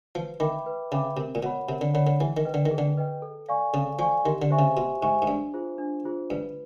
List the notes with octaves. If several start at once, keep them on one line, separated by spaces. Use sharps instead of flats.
F3 B4
D#3 E5 G5 B5 D6
B4
C#3 E5 G5 B5 D6
C3 A#4
A#2
B2 C#5 F#5 B5
C3 A#4
D3
D3 C#5 F#5 B5
D3
E3 G#4
D#3
B4 D#5 G5
D3
D#3
G#4
D3
B4 D#5 G5
A4
D5 F5 G#5 C#6
C#3 A4
F3 D5 F5 G#5 C#6
D#3 G4
D3
C5 E5 G#5 C#6
C#3
B2 G4
G#2 C5 E5 G#5 C#6
G#2
G2 D4
F4 G#4 C5
D4
F4 G#4 C5
G2 B4